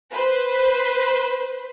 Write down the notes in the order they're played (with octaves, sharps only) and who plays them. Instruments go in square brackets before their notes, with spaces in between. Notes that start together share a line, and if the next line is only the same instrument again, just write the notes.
[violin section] B4 C5